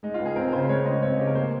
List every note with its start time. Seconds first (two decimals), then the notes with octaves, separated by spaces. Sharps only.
0.03 G#3 D#4
0.14 C#2 F4
0.25 G#4
0.36 C4 A#4
0.53 C#3 C5
0.69 G#3 C#5
0.85 C#2 D#5
1.02 C4 C#5
1.11 D#4
1.19 C#3 G4
1.27 A#4
1.35 A#3 C5